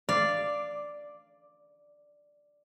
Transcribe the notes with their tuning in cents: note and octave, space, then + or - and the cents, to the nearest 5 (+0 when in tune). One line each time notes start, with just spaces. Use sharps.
D5 +0 F5 -15